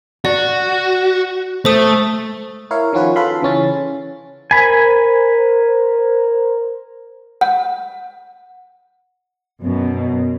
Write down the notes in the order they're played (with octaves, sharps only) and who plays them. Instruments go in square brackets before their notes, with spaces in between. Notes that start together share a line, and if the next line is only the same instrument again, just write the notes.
[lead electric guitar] F#4 [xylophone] D5
[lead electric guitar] A3 [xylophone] C5 D#6
[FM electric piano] E4 A#4 C#5 F5
D#3 F3 C#4 F4 F#4 B4
F4 A4 B4 F5 B5 C6
C#3 E3 C#4 A6
[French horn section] A#4 C5 [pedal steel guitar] G#5 B5
[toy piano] F#5
[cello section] F#2 B2